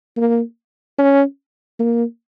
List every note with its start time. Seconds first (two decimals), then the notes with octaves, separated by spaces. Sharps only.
0.17 A#3
0.98 C#4
1.79 A#3